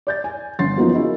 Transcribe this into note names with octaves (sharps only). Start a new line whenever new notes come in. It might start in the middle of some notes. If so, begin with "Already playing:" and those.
D5 G6 A6
G#5
G1 C#4 F#5 C6 A6
F3 F#3 A#3 B3 D#4 F4
C#4 E4 G#4 A#4 D#5